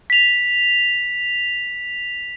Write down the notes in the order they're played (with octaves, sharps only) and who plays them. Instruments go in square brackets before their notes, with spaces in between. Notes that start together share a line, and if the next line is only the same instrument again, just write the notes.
[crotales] B6 F7